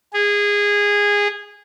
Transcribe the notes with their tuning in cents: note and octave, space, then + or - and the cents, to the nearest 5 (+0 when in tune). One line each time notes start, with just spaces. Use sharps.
G#4 -20